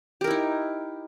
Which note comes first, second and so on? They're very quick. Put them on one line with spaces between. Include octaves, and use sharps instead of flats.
G4 A#4 E4 D#4